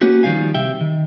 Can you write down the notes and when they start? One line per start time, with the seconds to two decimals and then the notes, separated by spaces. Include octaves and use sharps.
0.01 A#3 B3 C#4 F#4 G4
0.23 D#3 F3 G3 D#4 F5 G#5
0.54 C2 C3 G4 E5 G5
0.81 D#3